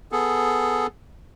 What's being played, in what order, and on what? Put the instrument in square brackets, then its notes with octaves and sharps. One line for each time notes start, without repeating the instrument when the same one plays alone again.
[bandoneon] B3 G#4 A4